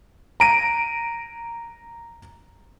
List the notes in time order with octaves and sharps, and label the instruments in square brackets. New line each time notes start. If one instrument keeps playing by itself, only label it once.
[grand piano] A#5 D7 D#7